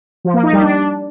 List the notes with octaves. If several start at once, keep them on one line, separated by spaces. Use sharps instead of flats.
F3
A#3
D#4
G3
D4